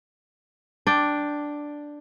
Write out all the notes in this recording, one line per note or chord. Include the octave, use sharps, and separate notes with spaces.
D4 G5